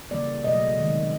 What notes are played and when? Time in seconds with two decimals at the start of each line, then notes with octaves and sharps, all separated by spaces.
0.11 C#3 E3 G3 A#3 D5
0.44 B2 F#3 A3 D#5
0.77 C3 D#3 G#3